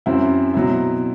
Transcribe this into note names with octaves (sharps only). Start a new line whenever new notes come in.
F#2 F#3 C4 E4
B2 F#3 C4 E4